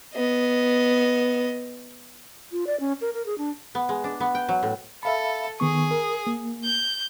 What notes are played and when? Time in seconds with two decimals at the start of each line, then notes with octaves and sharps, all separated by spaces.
0.15 B3 D#5
2.52 F4
2.67 D5
2.80 C#4
3.01 A#4
3.14 A#4
3.26 G#4
3.38 D4
3.75 B3
3.89 G#3
4.04 D4
4.20 B3
4.35 G5
4.49 F#3
4.63 A2
5.03 A4 E5 F5 B5
5.60 D#3 B3 G#4 C#6
5.91 A#4
6.27 A#3
6.64 G6